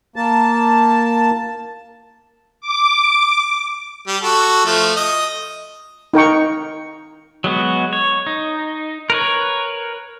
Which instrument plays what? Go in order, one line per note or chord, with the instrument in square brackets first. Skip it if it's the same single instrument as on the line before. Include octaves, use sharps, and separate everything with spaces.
[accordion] A#3 A5
[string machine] D6
[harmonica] G3
F#4 A4
F3 A3
D#5
[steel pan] D#4 A#4 G5 C#6
[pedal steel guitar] F#3 G#3 B3 F#4
C#5
D#4
A#4 B4 C#5